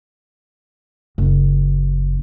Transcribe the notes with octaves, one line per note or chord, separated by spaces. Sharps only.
F#1